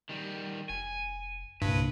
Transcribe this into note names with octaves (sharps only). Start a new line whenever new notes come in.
D#3 G3
F1 G#5
C2 G2 A#2 B4